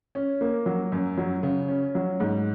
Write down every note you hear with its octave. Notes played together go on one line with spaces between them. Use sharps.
C#4
A#3
F#3
F#2
F#3
C#3
C#4
F#3
G#2